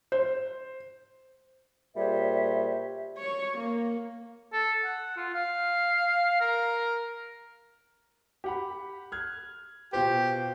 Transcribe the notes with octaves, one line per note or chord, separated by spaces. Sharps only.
C5
A#2 G3 G#4 C5 C#5 E5
C#5
A#3
A4
F#5
F4
F5
A#4
G4 F#5 B5
F6 F#6 G#6
B2 F4 G4 C5